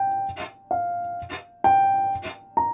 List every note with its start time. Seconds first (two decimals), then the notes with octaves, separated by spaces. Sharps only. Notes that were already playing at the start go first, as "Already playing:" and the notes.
Already playing: G5
0.71 F5
1.64 G5
2.57 A#5